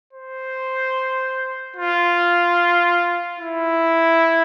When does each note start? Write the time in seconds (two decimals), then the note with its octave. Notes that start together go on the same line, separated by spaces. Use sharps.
0.13 C5
1.77 F4
3.40 E4